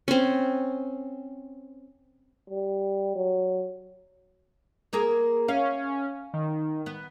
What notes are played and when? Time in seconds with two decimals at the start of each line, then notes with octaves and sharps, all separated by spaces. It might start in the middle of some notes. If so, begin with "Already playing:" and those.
0.08 C4 C#4
2.50 G3
3.15 F#3
4.93 A#3 G#4 A#4
5.48 C#4 F5
6.34 D#3
6.86 B3